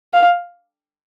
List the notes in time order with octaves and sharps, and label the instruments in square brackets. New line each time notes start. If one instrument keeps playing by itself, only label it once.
[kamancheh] F5